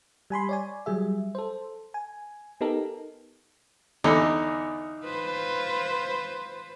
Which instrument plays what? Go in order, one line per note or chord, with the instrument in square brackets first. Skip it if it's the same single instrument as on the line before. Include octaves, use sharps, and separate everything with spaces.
[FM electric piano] G3 G#5 B5 C6
C#5 D5 G#5
F#3 G3 G#4 E5
A4 C5
G#5
B3 D#4 G4 A4 A#4
[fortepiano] E2 D3 [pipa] D#4
[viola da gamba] F4 B4 C5